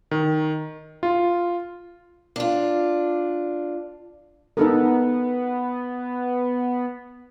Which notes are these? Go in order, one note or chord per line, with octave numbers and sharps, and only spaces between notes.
D#3
F4
D4 F4
B3 D#4 A4 A#4